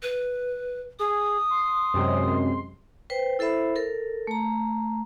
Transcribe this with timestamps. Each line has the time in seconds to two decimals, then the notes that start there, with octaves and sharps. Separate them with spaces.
0.03 B4
0.99 G#4 D#6
1.50 C6
1.94 F#2 C3 G#3
3.10 B4 C5 G5
3.39 E4 A4 C5 E5 B5
3.76 A4 A#4
4.27 A3 A#5